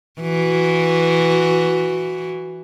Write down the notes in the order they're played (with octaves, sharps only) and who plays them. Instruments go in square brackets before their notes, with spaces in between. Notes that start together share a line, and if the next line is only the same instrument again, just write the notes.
[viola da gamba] E3 F#4